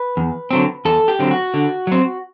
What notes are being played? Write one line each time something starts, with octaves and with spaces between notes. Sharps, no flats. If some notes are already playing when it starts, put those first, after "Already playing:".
Already playing: B4
E2
D3 F#3 C4
E2 A4
G4
D3 F#3 C4
F#4
D3
F#3 C4